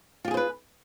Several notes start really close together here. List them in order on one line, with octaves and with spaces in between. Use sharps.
F4 G4 G#4 C5 B4